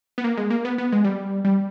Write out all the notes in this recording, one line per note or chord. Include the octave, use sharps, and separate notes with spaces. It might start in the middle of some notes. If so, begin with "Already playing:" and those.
B3
A#3
G#3
A#3
B3
B3
G#3
G3
G3